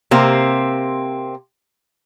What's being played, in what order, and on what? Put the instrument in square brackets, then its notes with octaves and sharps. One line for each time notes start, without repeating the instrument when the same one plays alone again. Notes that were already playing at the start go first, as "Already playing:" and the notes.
[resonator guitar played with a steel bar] C3 A#3 C4